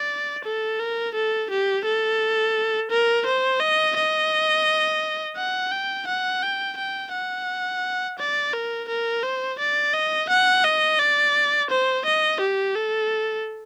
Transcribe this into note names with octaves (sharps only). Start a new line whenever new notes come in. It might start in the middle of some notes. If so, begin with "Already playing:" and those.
Already playing: D5
A4
A#4
A4
G4
A4
A#4
C5
D#5
D#5
F#5
G5
F#5
G5
G5
F#5
D5
A#4
A#4
C5
D5
D#5
F#5
D#5
D5
C5
D#5
G4
A4